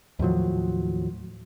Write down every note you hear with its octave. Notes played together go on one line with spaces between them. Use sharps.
D#2 A2 F3 F#3